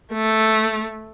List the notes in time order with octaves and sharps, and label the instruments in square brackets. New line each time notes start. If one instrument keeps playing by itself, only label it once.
[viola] A3